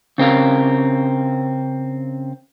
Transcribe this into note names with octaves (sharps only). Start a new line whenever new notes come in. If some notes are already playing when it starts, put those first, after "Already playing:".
C#3 C4 A#4 F5